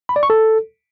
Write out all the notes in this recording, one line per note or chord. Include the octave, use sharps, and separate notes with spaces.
B5
D5
C#6
A4